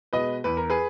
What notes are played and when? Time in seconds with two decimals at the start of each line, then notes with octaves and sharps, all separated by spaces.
0.13 B2 G#3 B4 D#5
0.44 E2 B4
0.57 A#4
0.70 G#4 B4